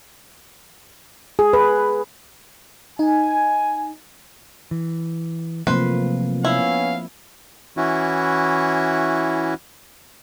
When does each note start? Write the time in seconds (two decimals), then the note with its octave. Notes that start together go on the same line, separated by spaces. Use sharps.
1.39 G#4
1.53 B4
2.99 D#4 G#5
4.71 E3
5.67 C3 F3 F#3 A3 A#3 C4 B4 C5
6.45 B3 C#4 E4 F5
7.77 E3 C#4 E4 F#4